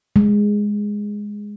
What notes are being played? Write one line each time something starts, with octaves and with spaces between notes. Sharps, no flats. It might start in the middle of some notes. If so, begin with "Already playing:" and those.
G#3